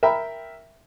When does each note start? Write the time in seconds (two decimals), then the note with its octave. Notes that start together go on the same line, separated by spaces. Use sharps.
0.03 A#4 E5 G5 B5